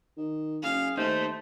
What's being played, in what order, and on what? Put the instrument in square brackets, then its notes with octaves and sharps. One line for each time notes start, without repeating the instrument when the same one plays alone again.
[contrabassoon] D#3
[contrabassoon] F#1 [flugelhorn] G#4 [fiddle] F5
[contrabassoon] D#2 [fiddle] A3 [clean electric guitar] D#4 [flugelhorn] C5